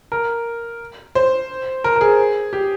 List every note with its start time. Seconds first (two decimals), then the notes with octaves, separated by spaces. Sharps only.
0.12 A#4
1.15 C5
1.84 A#4
1.96 A#4
2.01 G#4
2.53 G4